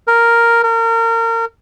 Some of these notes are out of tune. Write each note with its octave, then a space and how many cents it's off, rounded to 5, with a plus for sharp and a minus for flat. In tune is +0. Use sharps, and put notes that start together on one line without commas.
A#4 +0
A#4 -30